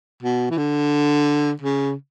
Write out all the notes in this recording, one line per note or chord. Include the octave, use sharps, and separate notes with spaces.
B2
E3
D3
C#3